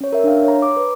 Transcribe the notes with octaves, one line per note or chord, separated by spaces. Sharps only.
C#4 C#5
A#4 E5
D4 F5
C#5 A#5
D6
B4